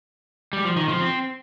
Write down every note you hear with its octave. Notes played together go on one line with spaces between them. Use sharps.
G3
F3
D#3
F3
C4